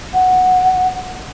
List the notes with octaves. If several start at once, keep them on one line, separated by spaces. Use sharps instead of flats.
F#5